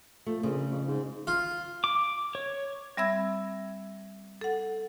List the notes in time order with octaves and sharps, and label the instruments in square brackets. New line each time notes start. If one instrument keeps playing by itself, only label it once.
[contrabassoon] F3 [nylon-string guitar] A3
[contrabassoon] A#1 [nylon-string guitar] C#3
[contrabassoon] F2
G#2
[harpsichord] F4
[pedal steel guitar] D6
C#5
[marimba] G3 C4 E5 B5 E6 G#6
A4 F#5